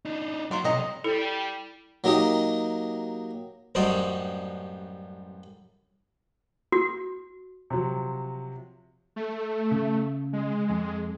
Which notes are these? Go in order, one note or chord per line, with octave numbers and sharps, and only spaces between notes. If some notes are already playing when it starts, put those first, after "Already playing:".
D4 D#4
F#3 A#3 F4 D5
B1 C3 F#3 D#5 A#5
G3 E4 A4
F#3 A#3 D#4 G4 D#5
A1 F#2 G3 C4 F#4 D#5
F#4
C3 F3 F#3
A3
C#3
G#3
F2